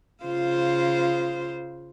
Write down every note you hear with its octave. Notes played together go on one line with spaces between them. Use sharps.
C#3 F4 C5